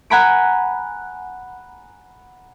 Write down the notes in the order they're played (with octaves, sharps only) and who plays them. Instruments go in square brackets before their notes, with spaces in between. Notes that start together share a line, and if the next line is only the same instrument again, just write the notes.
[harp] F#5 G#5 A#5 B5 B6 D7